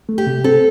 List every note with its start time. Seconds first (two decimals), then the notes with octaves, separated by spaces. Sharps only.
0.09 A3
0.18 G4
0.26 C3
0.44 C4 A4